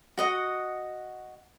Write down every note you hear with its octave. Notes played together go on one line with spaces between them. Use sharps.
F#4 D#5 F#5